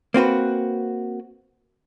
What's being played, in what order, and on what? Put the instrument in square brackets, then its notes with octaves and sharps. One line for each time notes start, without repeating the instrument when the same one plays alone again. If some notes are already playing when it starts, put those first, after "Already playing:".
[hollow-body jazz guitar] A#3 C4 F#4 B4